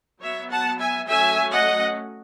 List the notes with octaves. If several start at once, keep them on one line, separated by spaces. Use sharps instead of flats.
F#3 B3 C#5 E5
F#5 A5
E5 G#5
F#3 A3 C#4 E5 G#5
D#5 F#5